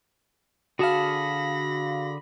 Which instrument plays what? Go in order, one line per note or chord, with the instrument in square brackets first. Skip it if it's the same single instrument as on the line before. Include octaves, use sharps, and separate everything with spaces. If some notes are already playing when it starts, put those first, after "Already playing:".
[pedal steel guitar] D3 G#4 A5 [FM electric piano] F#4 F5 [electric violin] B5 A#6